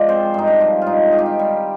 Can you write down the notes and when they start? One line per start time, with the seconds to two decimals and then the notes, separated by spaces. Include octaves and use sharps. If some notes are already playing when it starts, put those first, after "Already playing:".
Already playing: F3 G#3 D5
0.09 C4 C5
0.34 G2 D#4
0.47 D4
0.61 F3
0.82 G#2 D#4 F4
1.12 D#3 G#4
1.19 G4
1.26 F4
1.39 G3